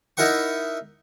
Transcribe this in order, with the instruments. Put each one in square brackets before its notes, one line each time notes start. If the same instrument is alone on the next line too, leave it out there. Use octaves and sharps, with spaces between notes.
[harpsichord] D#4 E4 A#4 F#5 C#6